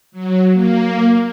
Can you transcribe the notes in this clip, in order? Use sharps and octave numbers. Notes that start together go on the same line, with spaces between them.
F#3
A#3